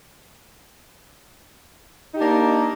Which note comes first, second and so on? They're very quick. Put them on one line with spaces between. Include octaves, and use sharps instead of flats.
D#4 G4 D4 A#3